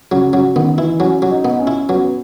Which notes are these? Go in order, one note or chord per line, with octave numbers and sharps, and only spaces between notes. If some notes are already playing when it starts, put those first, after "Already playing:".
C#3 F#3
C#3 F#3
D#3 B3
E3 E4
F#3 C#4
F#3
D#4
B3
C#4
E4
F#3 B3